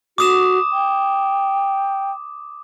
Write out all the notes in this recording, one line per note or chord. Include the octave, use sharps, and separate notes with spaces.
F#4 D6 D#6 E7
G5